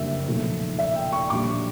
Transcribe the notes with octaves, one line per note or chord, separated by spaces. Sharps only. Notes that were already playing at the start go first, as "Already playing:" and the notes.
Already playing: F#1 F2 D3 G3 A#3 E5
B1 A#2 F3 A3
E5
G5
C#6
A#1 A#2 G3 D6